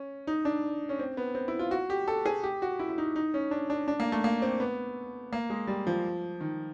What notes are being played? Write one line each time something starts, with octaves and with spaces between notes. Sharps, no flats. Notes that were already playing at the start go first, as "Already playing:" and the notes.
Already playing: C#4
D#4
D4
C#4
C4
B3
C4
E4
F4
F#4
G4
A4
G#4
G4
F#4
E4
E4
D#4
D#4
C#4
D4
D4
D4
A#3
A3
A#3
C4
B3
A#3
G#3
G3
F3
D#3